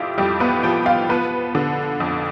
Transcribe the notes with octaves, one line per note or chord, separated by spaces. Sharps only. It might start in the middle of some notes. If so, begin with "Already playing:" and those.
Already playing: F2 F3 E4 F4 G4
F2 G3 G4
B3 B4
F3 G4 G5
F4 F5
F3 B3 B4
D3
F2